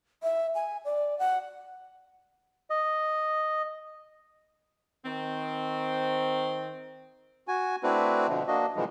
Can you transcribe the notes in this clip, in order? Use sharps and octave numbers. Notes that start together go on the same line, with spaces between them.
E5
G#5
D5
F#5
D#5
D#3 C4
F#4 G#5
A3 C4 D4 E4 F#4 B4
B2 D3 F3
A#3 D4 F#4 D#5
A#2 D3 E3 F3 G3 G#3